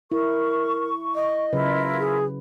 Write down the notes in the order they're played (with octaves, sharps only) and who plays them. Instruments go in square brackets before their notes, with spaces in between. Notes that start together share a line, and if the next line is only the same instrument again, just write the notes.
[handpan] E4 [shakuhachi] A#4 [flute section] C#6
[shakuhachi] D#5
[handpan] C#3 F#3 B4 [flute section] E4 F4 A#4
[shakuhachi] G#4